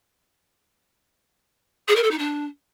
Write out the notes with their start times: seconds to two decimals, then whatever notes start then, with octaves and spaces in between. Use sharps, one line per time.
1.88 G#4
1.96 A#4
2.03 A4
2.11 D#4
2.19 D4